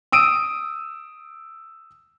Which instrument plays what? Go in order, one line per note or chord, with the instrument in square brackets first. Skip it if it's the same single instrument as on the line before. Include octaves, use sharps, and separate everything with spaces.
[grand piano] D#6 E6 D7 D#7